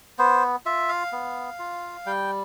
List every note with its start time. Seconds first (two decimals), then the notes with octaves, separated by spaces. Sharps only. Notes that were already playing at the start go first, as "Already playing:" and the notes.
0.18 B3 C5
0.66 F4 E5
0.89 F5
1.12 B3
1.59 F4
2.06 G3 G5